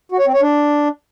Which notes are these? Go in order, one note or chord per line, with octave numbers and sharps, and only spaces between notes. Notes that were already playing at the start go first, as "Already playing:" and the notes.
F#4
C#5
C4
C#5
D4